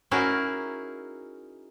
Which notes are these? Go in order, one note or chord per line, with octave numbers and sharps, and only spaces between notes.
C#4 D#4 E4 F#4 G#4 A#4